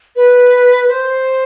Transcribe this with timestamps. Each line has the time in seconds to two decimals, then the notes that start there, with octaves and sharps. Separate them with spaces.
0.16 B4
0.88 C5